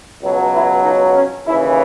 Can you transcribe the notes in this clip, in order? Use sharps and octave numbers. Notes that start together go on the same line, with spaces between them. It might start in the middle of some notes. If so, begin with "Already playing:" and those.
C#2 B2 F#3
E4
D#4
C#4
D#2 C#3 E3 E4